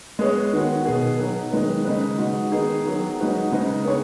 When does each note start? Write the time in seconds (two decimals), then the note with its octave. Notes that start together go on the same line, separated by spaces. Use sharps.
0.19 G#3 B3 G#4 C#5
0.53 D#3 B3 F#4
0.86 B2 B3 G#4
1.19 F#3 B3 D#4
1.53 D#3 G#3 B3
1.85 C#3 G#3 D#4 B4
2.18 G#3 D#4 F#4
2.52 D#3 B3 D#4 G#4
2.86 D#3 F#3 B3 G#4
3.18 G#3 D#4 F#4 B4 D#5
3.52 C#3 G#3 D#4 B4 D#5
3.85 B3 D#4 G#4 C#5